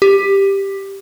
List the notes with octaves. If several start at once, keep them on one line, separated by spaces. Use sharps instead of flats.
G4